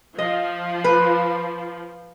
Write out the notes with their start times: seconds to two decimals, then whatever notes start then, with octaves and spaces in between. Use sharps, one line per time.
0.19 F3 D#5
0.84 B4